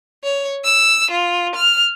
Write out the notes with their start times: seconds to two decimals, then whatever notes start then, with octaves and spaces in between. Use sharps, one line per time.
0.24 C#5
0.64 E6
1.10 F4
1.55 F6